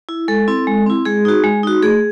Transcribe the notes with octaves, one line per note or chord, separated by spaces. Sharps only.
E4
G#3 A4
C4 E4
G#3
C4 E4
G#3 G#4
D#4 F#4
G#3
D#4 F#4
A3 G#4